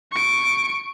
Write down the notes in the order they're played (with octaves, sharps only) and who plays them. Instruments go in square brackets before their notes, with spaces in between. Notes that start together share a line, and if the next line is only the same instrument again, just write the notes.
[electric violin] C#6 D7